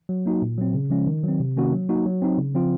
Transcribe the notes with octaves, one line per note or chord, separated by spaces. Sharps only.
F#3
A#3 D#4 F#4
A#2
F#3 C4
C#3
F3 G#3 C#4
D#3
F#3 C4
C3
D#3 A#3 C#4 F#4
F#3
A#3 D#4 F#4
F#3
C4 D#4
C#3
F3 C4 F4